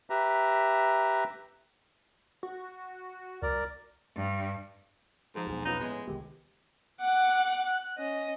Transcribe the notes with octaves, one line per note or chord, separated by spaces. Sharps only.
G4 B4 E5 A#5
F#4
C2 A#4 D5
G2
G#2 F3 G#4 A4
B1 E2 F#4
C#4 D#4 F4 B4
A2 G#3 B3
C2 D#3 G#3 G4
F#5 D6 F#6
F#6
C#4 D#5